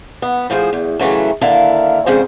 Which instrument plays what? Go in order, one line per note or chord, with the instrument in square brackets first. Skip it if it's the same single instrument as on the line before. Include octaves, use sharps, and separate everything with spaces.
[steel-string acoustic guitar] B3
A2 F3 G#4 C5
E2
C#3 E3 F#3 A3
D#2 D3 E4 A#4 F5 A5
F2 G#2 C#3 C5